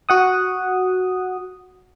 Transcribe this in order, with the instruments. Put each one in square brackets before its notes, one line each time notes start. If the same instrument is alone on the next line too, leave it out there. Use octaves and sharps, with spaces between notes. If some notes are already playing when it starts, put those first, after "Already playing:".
[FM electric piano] F#4 F#5 D#6